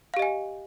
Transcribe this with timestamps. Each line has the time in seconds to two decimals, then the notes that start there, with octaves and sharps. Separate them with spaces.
0.14 F5
0.17 G4
0.19 D#5
0.22 G#5